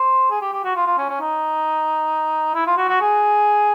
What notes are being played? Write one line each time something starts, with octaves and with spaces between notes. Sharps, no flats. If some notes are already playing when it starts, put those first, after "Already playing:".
Already playing: C5
G#4
G4
G4
F#4
F4
F4
C#4
C#4
D#4
E4
F4
F#4
F#4
G#4